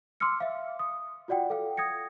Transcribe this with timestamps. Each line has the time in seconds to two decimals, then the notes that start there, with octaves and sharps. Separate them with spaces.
0.20 C6 D6 E6 F6 C#7
0.40 E5 F5
0.79 D#6
1.28 F4 F#4 D5 F#5 G5
1.50 A4 F5 G5
1.77 D#6 G#6 A#6 C#7